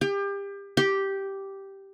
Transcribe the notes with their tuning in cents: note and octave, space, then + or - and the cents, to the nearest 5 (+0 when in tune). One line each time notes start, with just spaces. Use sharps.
G4 +30
G4 -5